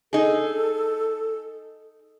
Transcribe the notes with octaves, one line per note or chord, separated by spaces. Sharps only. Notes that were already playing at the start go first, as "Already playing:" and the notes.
D#4 G#4 A4